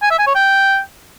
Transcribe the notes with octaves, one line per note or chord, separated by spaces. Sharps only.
G#5
E5
G#5
C#5
G5